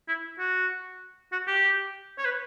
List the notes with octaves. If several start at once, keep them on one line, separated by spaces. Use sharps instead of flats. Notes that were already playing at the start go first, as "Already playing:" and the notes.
E4
F#4
F#4
G4
C#5
B4